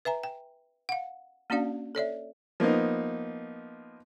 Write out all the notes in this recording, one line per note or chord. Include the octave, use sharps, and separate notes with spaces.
B4 E5 G#5 A#5
G5
F5 F#5
A#3 C#4 D4 F#4 D5 F5
A4 C#5 D5 E5
F3 A#3 B3 D#4